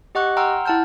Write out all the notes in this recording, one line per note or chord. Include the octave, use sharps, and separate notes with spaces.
G4 D#5 F#5 C#6 F#6
F#5 G5 A#5 C6 E6 F6
E4 F#5 A5 F6 G6